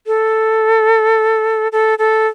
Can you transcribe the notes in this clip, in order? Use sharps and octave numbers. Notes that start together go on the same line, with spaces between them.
A4
A4
A4